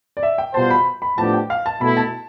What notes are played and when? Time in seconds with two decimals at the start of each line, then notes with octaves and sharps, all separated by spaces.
0.17 D5
0.23 E5
0.38 G5
0.54 B2 G3 B3 F4 C5 A5
0.70 B5
1.02 B5
1.18 A2 F3 B3 D4 G4 A5
1.34 G5
1.50 F5
1.66 A5
1.81 B2 A3 E4 B5
1.97 A5